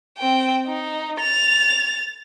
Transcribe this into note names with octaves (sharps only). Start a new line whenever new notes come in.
C4 G5
D#4
A6 F7